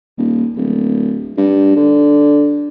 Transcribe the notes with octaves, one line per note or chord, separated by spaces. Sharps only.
D#1
D1
G2
D3